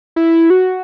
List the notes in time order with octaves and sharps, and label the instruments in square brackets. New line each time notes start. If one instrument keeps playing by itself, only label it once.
[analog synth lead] E4
F#4